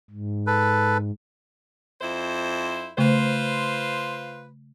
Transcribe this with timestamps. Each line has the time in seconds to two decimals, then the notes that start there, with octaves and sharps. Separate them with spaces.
0.10 G#2
0.47 A4 B4
2.01 F2 E4 C5
2.98 C#3 A3 F4 B4 C5